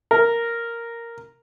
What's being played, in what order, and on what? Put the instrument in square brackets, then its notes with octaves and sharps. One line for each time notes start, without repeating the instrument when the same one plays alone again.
[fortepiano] A#4